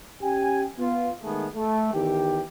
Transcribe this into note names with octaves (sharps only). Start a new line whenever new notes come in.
C#4 G4 G5 G#5
B3 F4
D#3 G#3 A3 B3 G#4
A3
E2 D#3 G4